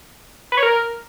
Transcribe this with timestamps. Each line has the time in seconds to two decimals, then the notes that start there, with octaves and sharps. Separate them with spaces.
0.52 B4
0.57 C#5
0.63 A#4